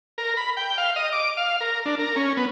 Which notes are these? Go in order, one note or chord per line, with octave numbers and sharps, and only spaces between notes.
A#4
B5
G5
F5
D#5
D6
F5
A#4
D4
A#4
C#4
B3